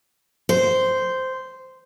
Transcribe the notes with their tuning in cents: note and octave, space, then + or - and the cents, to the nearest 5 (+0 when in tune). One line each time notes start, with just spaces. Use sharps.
C5 -10